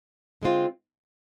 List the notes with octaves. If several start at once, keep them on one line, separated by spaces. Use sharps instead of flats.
D3 G#3 C4 F4